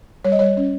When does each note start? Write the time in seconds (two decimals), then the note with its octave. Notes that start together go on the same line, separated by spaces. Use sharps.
0.25 G3 C#5
0.32 D#5
0.39 G3 C#5
0.57 C#4